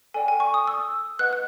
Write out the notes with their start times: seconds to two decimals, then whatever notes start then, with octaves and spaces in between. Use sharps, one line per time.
0.14 A4 D5 G5 G#5
0.28 G#5
0.40 C#6
0.54 D#6
0.67 E6
1.19 B4 D#5 F#5 F#6
1.33 F#6